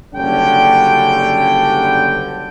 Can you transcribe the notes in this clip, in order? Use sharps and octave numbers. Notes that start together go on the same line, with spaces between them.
F#1 D3 G3 C#4 G5